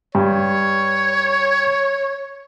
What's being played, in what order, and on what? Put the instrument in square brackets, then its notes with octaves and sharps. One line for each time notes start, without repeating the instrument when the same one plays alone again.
[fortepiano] G2 [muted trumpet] C#5